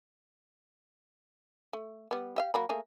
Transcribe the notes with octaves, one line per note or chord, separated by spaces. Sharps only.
A3
G3 B3
G4 E5 F5
F#3 A#3 B5
A3 A#3 G#4